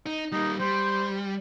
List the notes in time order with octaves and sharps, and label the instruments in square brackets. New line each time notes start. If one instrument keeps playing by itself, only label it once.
[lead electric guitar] D#4
[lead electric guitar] G3 A#3 [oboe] D#4
[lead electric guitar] G3 [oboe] C5